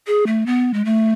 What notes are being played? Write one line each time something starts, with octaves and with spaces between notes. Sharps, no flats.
G#4
A3
B3
G#3
A3